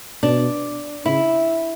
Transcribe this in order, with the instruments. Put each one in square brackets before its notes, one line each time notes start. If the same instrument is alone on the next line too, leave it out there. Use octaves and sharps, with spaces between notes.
[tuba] B2 [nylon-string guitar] D4
[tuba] C#3 [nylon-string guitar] E4